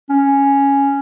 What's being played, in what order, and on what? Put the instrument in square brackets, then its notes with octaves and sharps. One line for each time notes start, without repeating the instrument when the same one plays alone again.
[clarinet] C#4